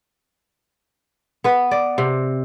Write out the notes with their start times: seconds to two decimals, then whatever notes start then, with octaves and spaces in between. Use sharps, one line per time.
1.44 B3 B4
1.71 D5
1.98 C3